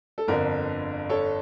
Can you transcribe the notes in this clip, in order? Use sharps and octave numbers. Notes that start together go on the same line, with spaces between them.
A4
G1 F2 D3 A#4
A4 C#5